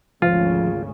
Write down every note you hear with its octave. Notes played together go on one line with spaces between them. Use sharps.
G#1 D2 C#3 F3 F4